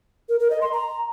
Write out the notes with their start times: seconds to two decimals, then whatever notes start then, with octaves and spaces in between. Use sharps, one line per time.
0.29 A#4
0.40 A#4
0.50 D#5
0.61 C6
0.72 A#5